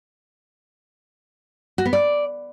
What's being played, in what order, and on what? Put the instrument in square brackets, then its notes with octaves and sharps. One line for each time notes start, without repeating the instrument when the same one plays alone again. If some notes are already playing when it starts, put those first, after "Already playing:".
[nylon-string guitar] F#4
B3
D5